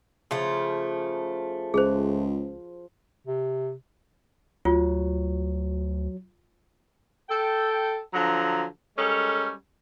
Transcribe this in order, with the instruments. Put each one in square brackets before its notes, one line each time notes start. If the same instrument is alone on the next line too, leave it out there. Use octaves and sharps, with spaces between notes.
[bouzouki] C#3 A3 [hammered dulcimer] F3
[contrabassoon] C#2 [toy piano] G#4 C5
[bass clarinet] C3
[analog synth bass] D2 [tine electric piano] F#3 [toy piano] F4
[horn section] A4 G5
D3 F3 F#3 A#5
G3 G#3 C#4 A4 A#4 C#5